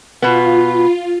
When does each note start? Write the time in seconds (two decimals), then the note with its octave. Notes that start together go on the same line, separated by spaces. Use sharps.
0.22 B2 B3 F4